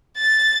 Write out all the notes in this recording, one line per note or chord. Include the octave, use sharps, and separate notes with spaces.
A6